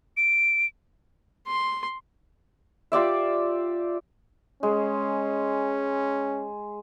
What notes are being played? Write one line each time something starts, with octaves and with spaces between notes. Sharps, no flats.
D7
C6
F4 G4 D5 E5
G#3 C#4